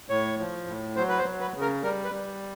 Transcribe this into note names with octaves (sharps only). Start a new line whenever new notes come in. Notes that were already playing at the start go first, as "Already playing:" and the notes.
A2 C#5
F3
A2
F#3 C5
B4
C5
F#3
B4
C#3
A#4
G3 A#4
B4
G3